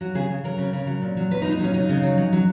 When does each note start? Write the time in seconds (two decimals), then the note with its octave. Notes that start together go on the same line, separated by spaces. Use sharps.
0.01 F#3 F#4
0.15 C#3 G#4
0.30 C#3
0.44 F#3 A#4
0.58 C#3
0.73 C#3
0.87 F#3
1.02 A#2
1.17 F#3
1.31 F#3 B4
1.42 D#4
1.45 A#2
1.52 D#4
1.60 F#3 C#4
1.74 C#3 D#4
1.89 C#3
2.03 F#3
2.18 F#3
2.33 F#3